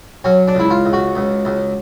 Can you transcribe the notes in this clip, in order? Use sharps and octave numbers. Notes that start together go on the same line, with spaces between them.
F#3 C#4
D4
C#2 E4
F4
C#2
F#4
C#2
C#2